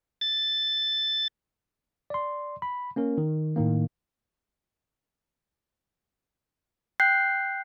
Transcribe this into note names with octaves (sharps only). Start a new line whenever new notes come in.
A6
D5 C6
B5
A#3 C#4 A#4
D#3
A2 D#3 A#3
G5 F#6 G6 C7